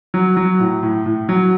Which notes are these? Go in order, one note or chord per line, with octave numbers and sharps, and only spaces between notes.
F#3
F#3
A2
A2
A2
F#3